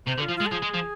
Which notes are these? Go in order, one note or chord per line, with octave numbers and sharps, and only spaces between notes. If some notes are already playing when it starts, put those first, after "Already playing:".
C3 C5
D3
F4
F3
G#3 F4
A4
F3 G#4
G#3
F3